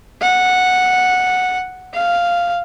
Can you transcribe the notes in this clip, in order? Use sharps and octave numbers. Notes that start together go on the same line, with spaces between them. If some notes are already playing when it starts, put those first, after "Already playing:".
F#5
F5